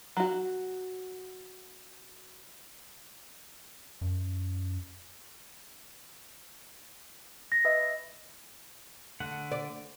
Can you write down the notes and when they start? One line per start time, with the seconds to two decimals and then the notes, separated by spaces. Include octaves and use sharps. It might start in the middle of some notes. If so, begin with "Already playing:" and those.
0.17 F#3 F#4
4.01 F#2
7.52 A#6
7.65 B4 D#5 E5
9.20 D3 A3 F#5
9.52 D5